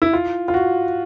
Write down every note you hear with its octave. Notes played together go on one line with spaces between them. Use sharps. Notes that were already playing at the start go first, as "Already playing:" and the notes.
E4
F4
F4
F#4